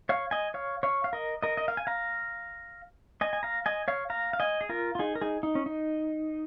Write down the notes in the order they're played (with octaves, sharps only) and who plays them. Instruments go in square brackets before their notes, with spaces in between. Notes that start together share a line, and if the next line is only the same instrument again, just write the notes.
[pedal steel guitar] C#5 F5
D#5 G#5
C#5 F5
C#5 F5
F5
A#4 D#5
A#4 D#5
D#5
F5
G#5
F5 A#5
D#5 G#5
G#5
F5 A#5
D#5 G#5
C#5 F5
F5 A#5
F5
D#5 G#5
G#4
F4 A#4
F4
D#4 G#4
A#4
D#4 G#4
D#4
C#4
D#4